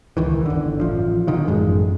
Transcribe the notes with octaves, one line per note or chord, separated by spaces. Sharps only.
C#2 D#3 E3
G1 D3
A1 F3
B2 D3 D#3 F3
A1 F#2 G#3